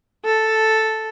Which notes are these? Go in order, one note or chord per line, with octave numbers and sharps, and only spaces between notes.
A4